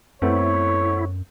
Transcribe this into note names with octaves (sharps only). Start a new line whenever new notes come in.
F#2 A3 B3 C4 E4 C#5